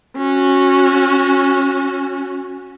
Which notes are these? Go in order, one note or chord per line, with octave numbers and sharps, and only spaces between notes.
C#4 F#4